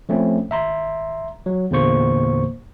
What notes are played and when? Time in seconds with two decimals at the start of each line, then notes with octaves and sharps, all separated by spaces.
0.09 F3 A3 C4 C#4
0.50 G#1 E5 A#5 C6
1.46 F#3
1.71 E2 A#2 D3 A#3 C5 C#6